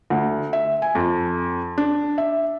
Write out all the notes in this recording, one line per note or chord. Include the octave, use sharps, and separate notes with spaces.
D2
E5
G#5
F2
D4
E5